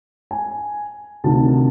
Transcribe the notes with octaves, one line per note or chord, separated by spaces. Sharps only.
G#5
D2 C3 D#3 A5